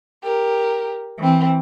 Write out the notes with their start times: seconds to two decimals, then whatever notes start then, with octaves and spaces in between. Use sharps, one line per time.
0.23 G4 A#4
1.19 E3 C4